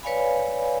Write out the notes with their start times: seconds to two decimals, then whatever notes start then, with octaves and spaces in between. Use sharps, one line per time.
0.03 B4 C#5 D5 F5 G#5 B5